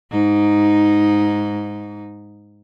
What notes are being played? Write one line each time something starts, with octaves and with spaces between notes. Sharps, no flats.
G#2 D#4